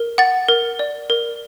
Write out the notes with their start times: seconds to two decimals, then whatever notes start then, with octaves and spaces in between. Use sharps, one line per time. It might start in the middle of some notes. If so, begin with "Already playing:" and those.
Already playing: A#4
0.18 F#5 A6
0.48 A#4
0.79 D5
1.10 A#4